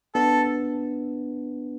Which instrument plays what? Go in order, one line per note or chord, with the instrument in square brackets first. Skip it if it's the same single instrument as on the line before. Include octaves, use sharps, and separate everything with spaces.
[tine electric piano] B3 D4 [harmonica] A4